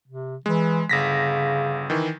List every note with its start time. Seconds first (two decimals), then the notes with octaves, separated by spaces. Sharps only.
0.08 C3
0.46 E3 G#3
0.89 G1 C#3 A#6 B6
1.90 D#3 E3